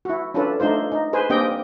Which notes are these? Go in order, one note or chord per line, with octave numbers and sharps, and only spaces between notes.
E4 F#4
C#4 D4 F4 A4 B4
A3 D4 D#4 F4 C5
D#4
G#4 B4 C5 G#5
A#3 C4 D4 G4 D#5 G5